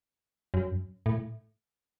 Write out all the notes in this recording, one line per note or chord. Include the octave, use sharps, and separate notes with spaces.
F#2
A2